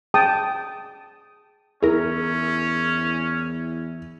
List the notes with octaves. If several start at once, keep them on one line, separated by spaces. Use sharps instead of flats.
G#4 G5 A5 D#6
E2 C#4 E4 G#4 A#4